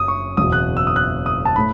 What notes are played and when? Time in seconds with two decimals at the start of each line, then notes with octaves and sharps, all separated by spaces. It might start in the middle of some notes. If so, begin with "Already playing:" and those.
Already playing: F#1 F#2 D#6
0.08 C#6
0.37 F#1 E2 B2 D#6
0.52 F#6
0.77 E6
0.87 D#6
0.96 F#6
1.26 D#6
1.45 A5
1.56 A2 B5